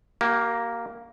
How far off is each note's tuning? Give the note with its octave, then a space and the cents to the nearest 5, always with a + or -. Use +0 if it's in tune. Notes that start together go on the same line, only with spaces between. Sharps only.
A#3 +0 G4 -40